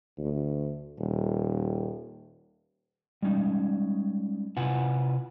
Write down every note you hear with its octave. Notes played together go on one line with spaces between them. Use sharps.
D2
D#1
G3 G#3 C#4 D#4
C3 E4 F4 B4 F#5 G#5